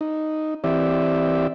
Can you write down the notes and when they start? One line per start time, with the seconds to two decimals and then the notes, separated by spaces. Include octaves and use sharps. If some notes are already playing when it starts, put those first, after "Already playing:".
0.01 D#4
0.64 E3 C4 G4 D5 E5